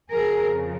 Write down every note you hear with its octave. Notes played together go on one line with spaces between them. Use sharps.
F2 C#3 F3 G#4 A#4